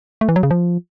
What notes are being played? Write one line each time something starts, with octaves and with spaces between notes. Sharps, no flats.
A3
E3
F#3
C#3
F3